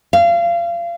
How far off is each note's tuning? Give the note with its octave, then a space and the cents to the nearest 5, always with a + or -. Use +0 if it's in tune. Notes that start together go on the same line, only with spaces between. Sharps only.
F5 -30